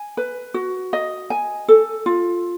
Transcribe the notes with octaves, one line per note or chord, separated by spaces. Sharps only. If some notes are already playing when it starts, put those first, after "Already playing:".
Already playing: G#5
B4
F#4
D#5
G#5
A4
F4